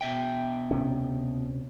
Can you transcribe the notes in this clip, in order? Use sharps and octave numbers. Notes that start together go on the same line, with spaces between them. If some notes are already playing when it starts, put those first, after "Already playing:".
B2 E5 G5
D2 C3 C#4